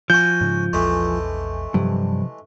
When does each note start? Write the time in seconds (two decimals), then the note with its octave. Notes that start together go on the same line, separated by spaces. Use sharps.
0.10 F3 F#4 G#5 G6
0.41 G#2 C#3
0.73 A#1 E2 E3 G#3 A3
1.74 G2 C3 F3 F#3